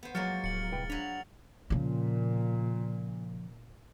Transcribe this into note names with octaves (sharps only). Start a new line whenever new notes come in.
B3 C5
F3 F#3 G#3 A#3 C#5 F6 A6 C#7
D1 C#7 F#7
C2 B4 G5
F#3 D4 B5 F7
A#2 C#3 F3